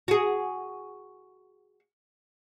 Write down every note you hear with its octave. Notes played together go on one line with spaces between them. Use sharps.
F#4 G#4